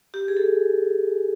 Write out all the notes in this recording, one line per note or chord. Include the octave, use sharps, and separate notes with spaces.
G4
G#4
A4